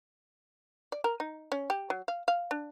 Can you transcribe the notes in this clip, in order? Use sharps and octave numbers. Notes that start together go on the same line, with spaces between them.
D5
A#4
D#4
C#4
G4
F#3
F5
F5
D4